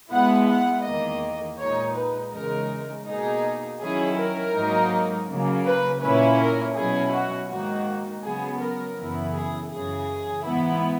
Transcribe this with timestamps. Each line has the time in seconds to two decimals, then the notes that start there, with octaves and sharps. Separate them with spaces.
0.11 B2 G#3 B3 E4 F#5
0.48 F#5
0.84 E2 D#3 A#3 D#5
1.59 A#2 G#3 D#4 C#5
1.96 B4
2.33 E2 C#3 G#3 D#4 A#4
3.06 B2 A#3 D#4 G#4
3.80 D#3 F#3 C#4 E4 G#4
4.17 A#4
4.54 G#2 F#3 A#3 D#4
5.28 C#3 F#3 A#3
5.65 B4
6.02 A#2 A#3 C#4 E4 B4
6.39 A#4
6.76 B2 F#3 C#4 E4 G#4
7.12 F#4
7.50 G#2 D#3 A#3 D#4 F#4
8.23 C#3 F#3 B3 G#4
8.60 A#4
8.97 F#2 C#3 E3 B3 E4
9.35 G#4
9.71 F#2 C#3 E3 G#4
10.45 G#2 E3 B3 E4